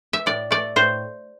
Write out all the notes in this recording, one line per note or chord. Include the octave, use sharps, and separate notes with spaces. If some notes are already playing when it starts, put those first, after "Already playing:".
E5
A2 D5
A3 D5
A2 C5